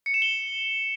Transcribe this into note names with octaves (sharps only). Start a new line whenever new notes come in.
C#7
E7
G7